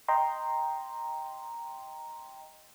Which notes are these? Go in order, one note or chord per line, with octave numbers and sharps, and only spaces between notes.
D#5 G5 A#5 C6